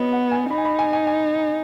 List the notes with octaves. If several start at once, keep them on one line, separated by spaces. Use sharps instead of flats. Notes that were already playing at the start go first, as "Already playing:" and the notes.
Already playing: B3 F#4 C#5 D#5
F#5
G#5
D#4 B5
G#5
B5
G#5
G#5
G#5